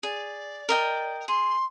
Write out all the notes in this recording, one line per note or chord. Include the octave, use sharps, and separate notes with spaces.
G#4 D5
A#4 D#5 G5
G#4 C6